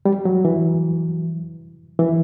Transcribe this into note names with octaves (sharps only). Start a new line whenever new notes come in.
G3
F#3
E3
E3